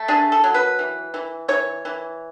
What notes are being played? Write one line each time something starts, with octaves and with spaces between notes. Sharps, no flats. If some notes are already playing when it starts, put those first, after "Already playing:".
Already playing: A3
D4 G#4
A4
F#3
B4
E3
E3
E3 C#5
E3